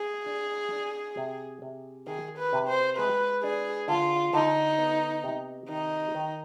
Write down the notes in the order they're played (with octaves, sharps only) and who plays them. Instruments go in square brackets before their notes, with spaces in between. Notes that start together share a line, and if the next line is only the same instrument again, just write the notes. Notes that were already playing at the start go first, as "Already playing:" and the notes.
Already playing: [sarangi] G#4
[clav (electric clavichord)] D4
D4
C3
C3
[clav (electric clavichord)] D#3 [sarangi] G#4
[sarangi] B4
[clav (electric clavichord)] C3
[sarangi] C5
[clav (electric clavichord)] G#3 [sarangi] B4
[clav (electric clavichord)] D4 [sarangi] G#4
[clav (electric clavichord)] D3 [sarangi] F4
[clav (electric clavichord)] D3 [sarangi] D#4
[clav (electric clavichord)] B3
C3
[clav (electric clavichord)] D#3 [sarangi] D#4
[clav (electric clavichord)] D#3